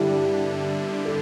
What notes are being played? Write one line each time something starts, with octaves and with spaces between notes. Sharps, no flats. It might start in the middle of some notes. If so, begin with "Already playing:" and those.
Already playing: G2 D3 G3 D4 E4 G4
A4